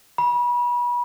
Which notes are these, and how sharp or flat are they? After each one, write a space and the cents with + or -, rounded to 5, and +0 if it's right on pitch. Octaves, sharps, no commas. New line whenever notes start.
B5 -30